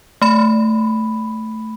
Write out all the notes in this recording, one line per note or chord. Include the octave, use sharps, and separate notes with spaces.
A3 B5